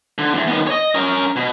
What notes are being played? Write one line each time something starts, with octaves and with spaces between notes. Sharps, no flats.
D3
E2
D#3 B3
C#5 D#5
C#4 A#4
B2